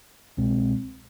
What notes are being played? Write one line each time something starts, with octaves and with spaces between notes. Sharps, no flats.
C2 B2 G#3 C4